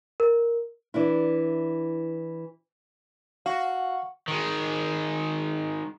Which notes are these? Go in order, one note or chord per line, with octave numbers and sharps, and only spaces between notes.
A#4
E3 D4 E4
F#4 F5
D#3 G#3